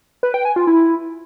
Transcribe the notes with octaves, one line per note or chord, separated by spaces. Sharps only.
B4
G5
G#5
F4
E4